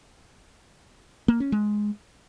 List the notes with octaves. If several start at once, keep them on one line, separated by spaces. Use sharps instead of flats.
A#3
C#4
G#3